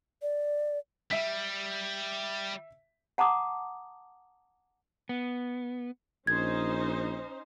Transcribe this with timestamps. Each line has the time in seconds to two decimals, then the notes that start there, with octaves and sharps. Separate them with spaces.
0.22 D5
1.11 G3 E5 B6
3.18 F#5 A5 A#5 D6 D#6
5.09 B3
6.27 A#1 C#4 D#4 C5 G#6